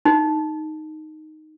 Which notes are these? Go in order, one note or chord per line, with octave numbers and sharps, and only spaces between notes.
D#4